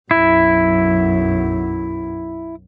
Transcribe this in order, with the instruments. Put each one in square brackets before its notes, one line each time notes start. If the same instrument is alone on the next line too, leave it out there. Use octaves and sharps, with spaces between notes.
[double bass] B1 F#2 [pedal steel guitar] E4